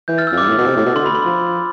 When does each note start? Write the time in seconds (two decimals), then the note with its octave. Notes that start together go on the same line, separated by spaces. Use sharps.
0.08 E3 G6
0.18 F6 A6
0.27 E6
0.32 F2
0.38 G2 D6
0.49 A2
0.58 B2
0.66 C3
0.76 A2
0.86 B2
0.95 D3 C6
1.06 B5
1.15 C6
1.25 F3